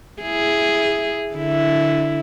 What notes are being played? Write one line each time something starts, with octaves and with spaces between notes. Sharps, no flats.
E4 G#4
D3 E4